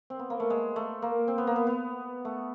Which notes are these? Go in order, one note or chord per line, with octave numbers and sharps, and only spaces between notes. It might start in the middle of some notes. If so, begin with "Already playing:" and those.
C4
B3
A#3
A3
G#3
A3
A#3
C4
B3
A#3
B3
B3
A3